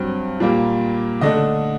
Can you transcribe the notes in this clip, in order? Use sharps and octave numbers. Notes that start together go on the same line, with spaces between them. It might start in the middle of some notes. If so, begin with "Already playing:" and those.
Already playing: G2 F#3 C4
A#2 G3 A#3
D3 A3 D4 D#5